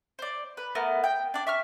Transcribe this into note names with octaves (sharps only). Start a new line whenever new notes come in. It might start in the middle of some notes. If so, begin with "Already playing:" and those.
C5 D5
B4
A3 B3 A#4
G5
D4 D5
E5 C#6 F6